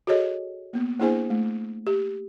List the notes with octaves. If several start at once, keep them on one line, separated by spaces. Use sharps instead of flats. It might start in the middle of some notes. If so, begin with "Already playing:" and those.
F#4 G#4 A4 C#5 D#5
A#3 B3
A#3 D4 E4 G#4 C5 G#5
A3
G4